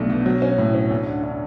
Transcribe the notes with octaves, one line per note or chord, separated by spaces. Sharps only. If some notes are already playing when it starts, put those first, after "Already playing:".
Already playing: B1 A3 D4
B2
F#3
C#4
A2
C#4
D2
D3
D3